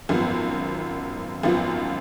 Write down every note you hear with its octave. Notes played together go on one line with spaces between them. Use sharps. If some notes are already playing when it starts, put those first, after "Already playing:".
G#1 F#2 F3 B3
G#1 F#2 F3 B3 F4